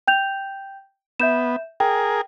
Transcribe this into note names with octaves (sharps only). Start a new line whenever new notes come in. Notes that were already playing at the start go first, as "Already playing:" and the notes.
G5 G6 F7
B3 E5 G6 E7
G#4 A#4 G5